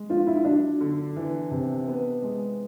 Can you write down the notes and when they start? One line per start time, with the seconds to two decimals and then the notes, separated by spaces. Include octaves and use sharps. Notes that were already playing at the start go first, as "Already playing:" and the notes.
Already playing: G#3
0.10 F3 F4
0.27 E4
0.45 F#3 D4
0.81 D3
1.16 E3
1.51 C3
1.87 B3
2.22 G#3